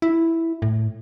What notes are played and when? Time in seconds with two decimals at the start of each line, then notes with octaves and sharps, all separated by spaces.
0.02 E4
0.62 A2